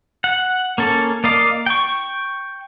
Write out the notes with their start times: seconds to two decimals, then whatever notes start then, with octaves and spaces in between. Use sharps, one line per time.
0.24 F#5
0.78 A#3 C#4 A4
1.24 A#3 D5 D#5 F5 D6
1.66 G5 C#6